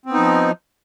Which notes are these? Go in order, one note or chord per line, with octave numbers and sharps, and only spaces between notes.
F3 B3 C4 D#4